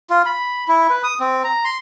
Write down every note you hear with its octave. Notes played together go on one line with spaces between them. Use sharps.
F4
B5
E4
B4
D#6
C4
A#5
C6